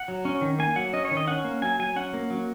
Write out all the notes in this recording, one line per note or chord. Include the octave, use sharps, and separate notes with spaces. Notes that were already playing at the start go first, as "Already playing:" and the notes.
Already playing: F#5
F#3
C#4
D#3
A#3 G#5
F#3 F#5
C#4 D#5
C#5
D#3
D#5
C#4 F#5
A#3
F#3 G#5
F#3 G#5
C#4 F#5
A#3
F#3